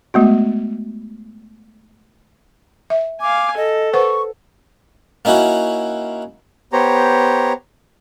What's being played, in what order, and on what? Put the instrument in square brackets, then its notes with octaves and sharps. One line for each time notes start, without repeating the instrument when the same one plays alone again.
[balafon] G#3 A3 B3 F#4
E5
[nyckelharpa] F5 G#5 [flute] D6
[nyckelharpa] A4 [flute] D#5
[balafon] B4 C5 F#5 [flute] C#6
[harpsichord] A#3 C#4 D#4 E4 F#4
[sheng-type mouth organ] B3 G4 C5 C#5 A#5